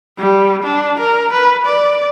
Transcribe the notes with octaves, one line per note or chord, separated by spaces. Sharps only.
G3
D4
A#4
B4
D5